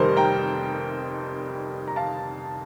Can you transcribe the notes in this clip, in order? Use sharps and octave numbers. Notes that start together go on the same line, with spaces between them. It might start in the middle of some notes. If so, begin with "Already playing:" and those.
Already playing: F1 F2 D#3 G3 A#4 C5
G5 A#5
A#5
F5 A5